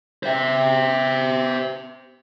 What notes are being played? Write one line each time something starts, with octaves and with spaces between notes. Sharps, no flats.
C5 E5